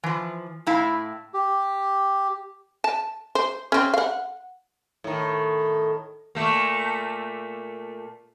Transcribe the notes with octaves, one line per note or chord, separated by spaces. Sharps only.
E3 F3
A2 E4 F5
G4
A5
C5
C4 C#4
F5 F#5
A2 D#3
A#2 A3 A#3